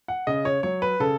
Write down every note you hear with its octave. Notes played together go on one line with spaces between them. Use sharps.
F#5
C#3 D#5
C#5
F#3 C#5
B4
C#3 A4